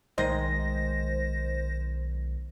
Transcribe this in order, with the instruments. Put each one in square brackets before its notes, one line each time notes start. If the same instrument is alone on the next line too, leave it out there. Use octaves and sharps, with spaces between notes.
[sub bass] B1 [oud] D#3 G#3 D#5 [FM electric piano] C5 A#6